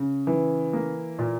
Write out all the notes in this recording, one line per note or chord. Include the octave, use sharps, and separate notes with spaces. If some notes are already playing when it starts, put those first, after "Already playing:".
Already playing: C#3
E3
A#3
A#2